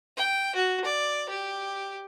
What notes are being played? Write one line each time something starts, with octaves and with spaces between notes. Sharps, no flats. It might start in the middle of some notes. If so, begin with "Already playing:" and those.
G5
F#4
D5
G4